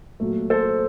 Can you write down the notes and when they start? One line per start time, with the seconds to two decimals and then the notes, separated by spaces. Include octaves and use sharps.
0.20 A#2 F#3 A3
0.50 A4 C5